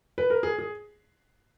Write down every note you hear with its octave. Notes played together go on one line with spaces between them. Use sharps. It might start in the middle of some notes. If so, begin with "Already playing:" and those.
B4
A#4
G#4
G#4